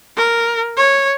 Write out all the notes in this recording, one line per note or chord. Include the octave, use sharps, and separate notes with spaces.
A#4
C#5